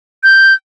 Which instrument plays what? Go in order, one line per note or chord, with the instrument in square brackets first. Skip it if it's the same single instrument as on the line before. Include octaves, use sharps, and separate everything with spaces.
[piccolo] G6